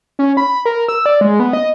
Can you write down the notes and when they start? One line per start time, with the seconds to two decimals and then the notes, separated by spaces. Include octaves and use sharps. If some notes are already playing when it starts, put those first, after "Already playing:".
0.19 C#4
0.37 B5
0.66 A#4
0.88 E6
1.06 D5
1.21 G#3
1.40 B3
1.53 D#5